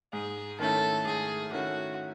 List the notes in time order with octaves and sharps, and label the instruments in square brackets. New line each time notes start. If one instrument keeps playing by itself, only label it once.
[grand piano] G#2 [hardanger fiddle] G#4
[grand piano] D#3 A3 C#4 E4 [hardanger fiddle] A4
[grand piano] G#2 [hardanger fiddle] G#4
[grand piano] D#3 A3 C#4 E4 [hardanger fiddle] F#4